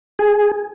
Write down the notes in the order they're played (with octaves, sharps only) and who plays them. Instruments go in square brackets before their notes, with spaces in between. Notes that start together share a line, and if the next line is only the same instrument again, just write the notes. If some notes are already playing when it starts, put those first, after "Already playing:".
[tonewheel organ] G#4